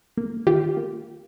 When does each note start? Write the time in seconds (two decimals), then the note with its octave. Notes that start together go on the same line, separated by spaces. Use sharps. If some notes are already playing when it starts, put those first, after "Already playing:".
0.17 A#3
0.47 D#3 F4 G4
0.77 A#3